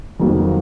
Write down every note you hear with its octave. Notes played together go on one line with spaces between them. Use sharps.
F2 D#3 F#3 A#3